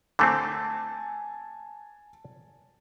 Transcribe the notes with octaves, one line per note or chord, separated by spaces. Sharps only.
D3 A3 C4 G#5 A5